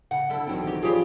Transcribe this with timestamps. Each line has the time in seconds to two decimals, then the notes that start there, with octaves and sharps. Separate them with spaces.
0.11 C#3 F#5
0.29 D3 E4 A4
0.47 B1 D#3 E3 C4
0.67 G4
0.83 F3 G3 C#4 G4 G#4